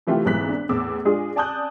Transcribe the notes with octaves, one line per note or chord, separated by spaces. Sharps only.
C3 E3 A3 F4 G4
F1 B1 G#2 E3 F#6 B6
D4
E2 A2 D6 E6
G#3 D4 F4 G#4
D5 G#5 A5 D#6 F#6 G6